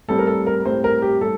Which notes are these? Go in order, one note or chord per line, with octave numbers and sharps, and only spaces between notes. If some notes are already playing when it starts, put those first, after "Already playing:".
A2 G3 C4 A4
A#4
A4
A#4
A2 G3 C4 C5
A#4
G4
A2 G3 A4